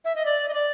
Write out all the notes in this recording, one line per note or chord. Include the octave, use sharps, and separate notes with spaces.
E5
D#5
D5
D#5
D5